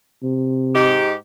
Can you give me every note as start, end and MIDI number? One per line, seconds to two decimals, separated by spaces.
0.23 0.98 48
0.75 1.14 44
0.75 1.14 63
0.75 1.14 67